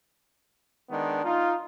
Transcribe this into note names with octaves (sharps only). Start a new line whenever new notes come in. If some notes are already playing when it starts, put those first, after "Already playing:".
D#3 G#3 B3 D4
D#4 F4